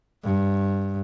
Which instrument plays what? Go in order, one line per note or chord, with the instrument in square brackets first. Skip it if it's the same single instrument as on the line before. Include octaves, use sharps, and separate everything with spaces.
[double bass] G2